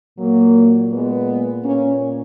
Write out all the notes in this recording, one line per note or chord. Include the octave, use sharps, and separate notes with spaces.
A#2 F#3 A#3
G#3 B3
A#2 A#3 C#4